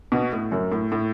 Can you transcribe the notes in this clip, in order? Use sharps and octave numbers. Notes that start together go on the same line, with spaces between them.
B2
A2
F#2
A2
A2